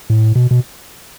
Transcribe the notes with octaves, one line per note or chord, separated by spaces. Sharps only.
A2
B2
B2